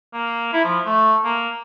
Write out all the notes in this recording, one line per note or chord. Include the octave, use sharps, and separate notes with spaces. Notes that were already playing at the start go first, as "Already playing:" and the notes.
A#3
E4
F3
A3
A#3